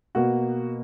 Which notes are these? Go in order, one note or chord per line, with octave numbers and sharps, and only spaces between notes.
B2 A#3 F#4